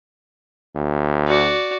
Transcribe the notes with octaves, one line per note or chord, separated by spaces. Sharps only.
D2
F#4 D5